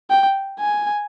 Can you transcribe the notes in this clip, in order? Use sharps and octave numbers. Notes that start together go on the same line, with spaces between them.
G5
G#5